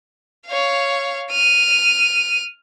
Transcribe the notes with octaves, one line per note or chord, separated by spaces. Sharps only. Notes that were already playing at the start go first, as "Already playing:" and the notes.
C#5 F5
F6 D#7